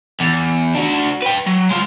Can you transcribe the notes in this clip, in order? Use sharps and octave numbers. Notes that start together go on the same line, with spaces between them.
E2
D4 F#4
B4 G5
F#3
G#3 F4